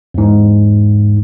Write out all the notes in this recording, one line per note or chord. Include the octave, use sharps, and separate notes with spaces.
E2 G#2